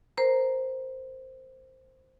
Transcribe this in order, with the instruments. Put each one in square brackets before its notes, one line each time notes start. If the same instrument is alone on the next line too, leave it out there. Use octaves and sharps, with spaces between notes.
[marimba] A#4 C5 A#5